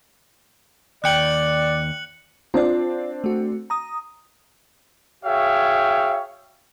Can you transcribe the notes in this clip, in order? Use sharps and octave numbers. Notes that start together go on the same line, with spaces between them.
D#2 D5 G5 F#6 C#7 F#7
C4 D4 F4 D5
A3 F#4
A#5 D#6
F#4 G#4 C#5 E5 F5 G5